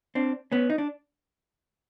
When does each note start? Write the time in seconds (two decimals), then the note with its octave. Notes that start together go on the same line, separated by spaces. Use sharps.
0.15 C4 D4
0.52 B3 C#4
0.70 D#4
0.78 D4